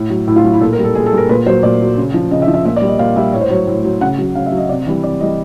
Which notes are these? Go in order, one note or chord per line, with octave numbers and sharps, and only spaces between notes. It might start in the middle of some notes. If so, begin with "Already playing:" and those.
Already playing: A2
F#3
A2 E4
F4
F#3 F#4
E4
A#2 A4
A#4
G3
A4
A#2 G#4
A4
G3 A#4
A#2 B4
F#3 C5
A#2 D5
F#3
C#3
F3
C#3 D#5
E5
F3
E5
A#2 E5
D5
G3
D#5
A#2 F5
G3 E5
A2 C#5
C5
F#3 C#5
A2
F#3
C#3 F#5
F#3
C#3 F5
E5
F#3
D#5
C3 D5
E3 G3
C3 D5
E3 G3 D#5